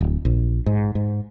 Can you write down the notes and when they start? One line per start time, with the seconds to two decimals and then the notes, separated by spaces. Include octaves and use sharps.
0.01 D1
0.25 A#1
0.66 G#2
0.95 G#2